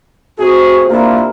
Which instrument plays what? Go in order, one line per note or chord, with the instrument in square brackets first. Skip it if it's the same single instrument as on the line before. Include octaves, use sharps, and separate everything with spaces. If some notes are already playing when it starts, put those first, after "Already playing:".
[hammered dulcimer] C3 [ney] F#4 [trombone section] G#4
[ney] A#3 [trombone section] D4 E4 F4 [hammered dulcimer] A#4